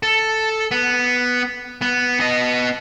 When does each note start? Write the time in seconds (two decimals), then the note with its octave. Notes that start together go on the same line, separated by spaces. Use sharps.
0.03 A4
0.71 B3
1.81 B3
2.20 B3 D#5